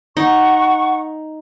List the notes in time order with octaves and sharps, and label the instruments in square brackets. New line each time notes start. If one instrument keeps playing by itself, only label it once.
[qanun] D#4 [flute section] F#5 C#6